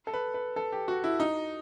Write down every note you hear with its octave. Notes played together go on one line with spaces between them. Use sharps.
A4
B4
B4
A4
G4
F#4
E4
D#4